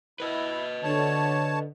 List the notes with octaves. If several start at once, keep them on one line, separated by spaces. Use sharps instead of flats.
E4 B4 D#5
D3 C#5 A5